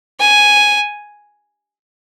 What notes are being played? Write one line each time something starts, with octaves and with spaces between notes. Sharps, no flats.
G#5